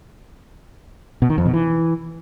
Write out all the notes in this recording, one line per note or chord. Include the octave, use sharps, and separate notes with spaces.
B2
D#3
F2
B2
E3